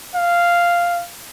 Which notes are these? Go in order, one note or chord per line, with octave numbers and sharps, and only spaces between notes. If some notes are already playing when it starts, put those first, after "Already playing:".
F5